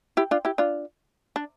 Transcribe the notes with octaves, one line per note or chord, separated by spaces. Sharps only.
E4 G4
D4 F4
E4 G4
D4 F4
D4